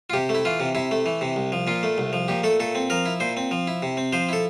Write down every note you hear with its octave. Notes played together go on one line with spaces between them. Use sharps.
F4
C3 G4
A3
E4
E3 F4
C3
C3 E4
A3
E3
C3
C2
F3
A#2 F4
A3
C2
F3
A#2 G4
A3 A4
A#2 A4
C4
F3 A#4
E4
A#2 C5
C4
F3
E4
C3
C4
F3 C5
E4 A4